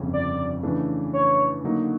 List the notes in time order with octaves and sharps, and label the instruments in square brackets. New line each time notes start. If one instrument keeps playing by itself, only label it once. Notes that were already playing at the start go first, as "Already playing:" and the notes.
Already playing: [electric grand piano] G1 F2 C#3
[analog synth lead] D5
[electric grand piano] C#3 E3 A3 D4
[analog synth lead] C#5
[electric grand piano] D3 F#3 A#3 D#4